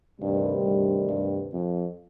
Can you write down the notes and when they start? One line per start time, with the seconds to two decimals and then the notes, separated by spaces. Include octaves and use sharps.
0.20 D2 G2 C3 D#3 G3
0.65 G2
1.09 G2
1.54 F2